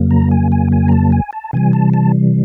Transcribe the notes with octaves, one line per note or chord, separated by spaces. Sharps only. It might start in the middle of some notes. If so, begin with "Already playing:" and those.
Already playing: F2 C#3 F#3 A#3
A#5
G#5
G#5
G#5
A#5
A5
G#5
A5
C3 E3 G3 G#5
A5
A5